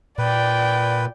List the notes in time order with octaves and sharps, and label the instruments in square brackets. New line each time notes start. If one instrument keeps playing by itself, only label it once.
[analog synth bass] A#2 [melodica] B4 [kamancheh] D5 G5